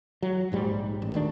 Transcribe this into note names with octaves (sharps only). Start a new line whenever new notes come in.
F#3
A#1 G#2 G3
A1
D2 D#3 D4